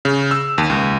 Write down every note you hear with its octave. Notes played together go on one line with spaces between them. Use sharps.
C#3
E6
D#2
C#2